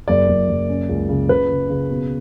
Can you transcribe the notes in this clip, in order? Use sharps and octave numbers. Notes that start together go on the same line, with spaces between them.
F#1 D5
F#1
F#1
C#4
C#2
C#3
C#3 B4
C#3
C#3
B2